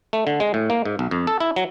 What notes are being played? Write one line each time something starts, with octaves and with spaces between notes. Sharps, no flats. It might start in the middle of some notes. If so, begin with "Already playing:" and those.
A3
D3
G#3
A2
A#3
G#2
B1
F2
A4
E4
F#3